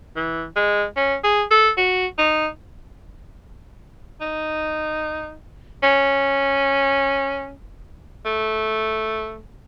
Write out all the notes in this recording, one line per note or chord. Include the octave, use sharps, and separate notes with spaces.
E3
G#3
C#4
G#4
A4
F#4
D#4
D#4
C#4
A3